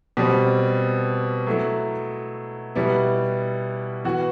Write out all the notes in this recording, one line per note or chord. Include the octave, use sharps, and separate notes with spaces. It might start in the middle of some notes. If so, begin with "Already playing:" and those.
B2 G3 C4
F#3 A3 E4
B2 G3 B3 E4
E3 B3 F#4